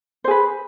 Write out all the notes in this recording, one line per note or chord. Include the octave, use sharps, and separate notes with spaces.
G#4 B4 C5